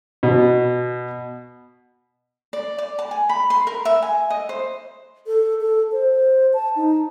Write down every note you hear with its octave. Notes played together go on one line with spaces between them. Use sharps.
B2
D5
D5
A5
G#5
B5
C6
A#4
E5
G#5
D#5
C5
A4
A4
C5
A5
D#4